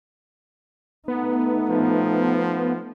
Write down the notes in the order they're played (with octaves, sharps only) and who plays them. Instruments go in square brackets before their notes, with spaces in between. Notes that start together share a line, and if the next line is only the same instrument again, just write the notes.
[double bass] A3 D#4 [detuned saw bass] B3
[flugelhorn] F3